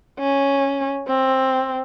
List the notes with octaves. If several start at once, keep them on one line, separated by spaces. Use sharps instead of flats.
C#4
C4